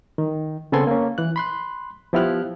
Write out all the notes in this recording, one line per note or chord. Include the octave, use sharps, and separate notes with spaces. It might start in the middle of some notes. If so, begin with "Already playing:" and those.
D#3
C#3 B3 C4 A4 G#5 C6
A#3 C#4
E3 F#6
B5 C6 F#6
F3 B3 E4 G4 F6 F#6